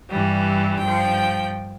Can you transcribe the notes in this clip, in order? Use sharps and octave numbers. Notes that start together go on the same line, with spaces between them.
G2 E3 G3
G2 F3 G5